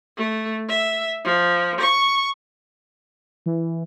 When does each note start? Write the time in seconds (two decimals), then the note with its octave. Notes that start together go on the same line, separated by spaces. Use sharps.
0.17 A3
0.68 E5
1.24 F3
1.81 C#6
3.46 E3